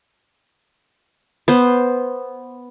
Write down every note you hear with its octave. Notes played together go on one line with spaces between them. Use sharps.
B3 C5